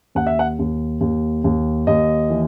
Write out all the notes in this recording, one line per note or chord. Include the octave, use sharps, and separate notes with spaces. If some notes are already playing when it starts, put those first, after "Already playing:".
D#2 F#5
E5
F#5
D#2
D#2
D#2
D#2 D#5
E3